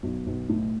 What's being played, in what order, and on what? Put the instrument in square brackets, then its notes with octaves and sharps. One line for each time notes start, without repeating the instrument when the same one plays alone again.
[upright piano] B1
B1
A2